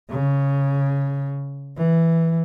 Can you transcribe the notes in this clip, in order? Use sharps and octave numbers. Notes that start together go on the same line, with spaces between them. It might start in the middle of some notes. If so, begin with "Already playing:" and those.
C#3
E3